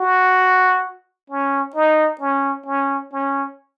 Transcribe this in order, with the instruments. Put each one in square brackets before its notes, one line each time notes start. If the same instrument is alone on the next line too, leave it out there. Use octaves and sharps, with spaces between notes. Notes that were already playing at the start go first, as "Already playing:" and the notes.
Already playing: [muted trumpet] F#4
C#4
D#4
C#4
C#4
C#4